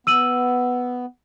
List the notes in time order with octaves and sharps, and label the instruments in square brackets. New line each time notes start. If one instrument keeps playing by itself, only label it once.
[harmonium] B3 [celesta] E6 D#7 F#7